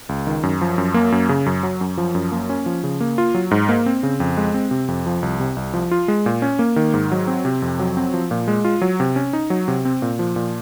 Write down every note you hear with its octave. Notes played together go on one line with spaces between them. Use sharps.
C#2
D#3
F#2
F3
F#2
A#3
F#2
C#3
F#2
F#3
F#2
F3
F#2
A#3
C#4
F3
C#3
A#3
F4
F#3
G#2
A#3
C4
C#3
F2
G#3
C4
C3
F2
F3
C2
C3
C2
F3
F4
G#3
A#2
C#4
A#3
D#3
G#2
F#3
C4
C3
F2
F#3
C4
F3
A#2
G#3
F4
F#3
C3
C#4
D#4
F#3
C3
C4
A#2
F3
A#2